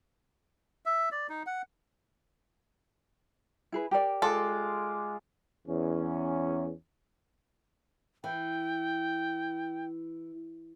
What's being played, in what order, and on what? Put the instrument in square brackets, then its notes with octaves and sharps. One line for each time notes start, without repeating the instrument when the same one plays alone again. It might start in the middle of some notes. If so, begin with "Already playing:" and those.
[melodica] E5
D5
D#4
F#5
[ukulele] E4 G#4 B4
G4 A#4 D5
[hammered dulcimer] G#3 F4 D6 [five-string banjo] A4
[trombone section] E2 C#4
[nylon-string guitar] E3 [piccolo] G5